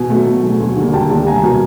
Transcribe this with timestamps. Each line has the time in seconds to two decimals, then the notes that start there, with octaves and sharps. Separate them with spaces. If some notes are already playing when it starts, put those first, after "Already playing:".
Already playing: B2 G#5
0.10 F#3 A3
0.27 B2
0.43 F#3 A3
0.60 D2
0.77 D3 G3 A#3
0.93 D2 G5 A5
1.10 D3 G3 A#3
1.26 C2 G#5 A#5
1.43 B2 F#3 A#3